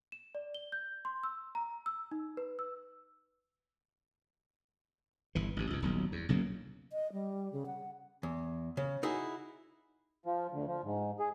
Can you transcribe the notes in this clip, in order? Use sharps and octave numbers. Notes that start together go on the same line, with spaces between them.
E7
D5
G7
G6
C6
E6
A#5
E6
D#4
B4
E6
G1 E3
A1 G2
C#2 G2
D#1 B1
E2
B1 C#3 F#3 A#3
D#5
G3
C#3
F#5
E2
C#3
D#4 E4 F#4 G#4
F3
D2
F3
G#2
G#4